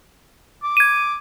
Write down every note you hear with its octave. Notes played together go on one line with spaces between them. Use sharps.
D6
G#6 D#7